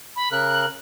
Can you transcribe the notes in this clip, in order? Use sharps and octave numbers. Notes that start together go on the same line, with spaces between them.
B5
C#3 A#4 F#6